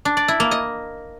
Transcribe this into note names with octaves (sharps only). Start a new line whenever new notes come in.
D4
D5
E4
A#3
D#5